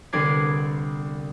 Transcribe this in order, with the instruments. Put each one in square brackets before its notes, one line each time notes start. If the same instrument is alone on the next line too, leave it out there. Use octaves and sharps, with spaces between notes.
[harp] C2 D3 B3 D6 G#6 C7